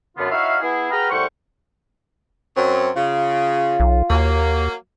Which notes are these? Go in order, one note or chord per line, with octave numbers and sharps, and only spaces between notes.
F#2 D3 B3 F4
D#4 E4 F#4 C#5 E5 F5
B3 E4 G#4
F#4 G#4 B4 G5 A#5 F6
C2 A2 G3 C5 F#5 C#6
F#2 F#3 C4
C#3 F4
B1
D#2 F#3 A#3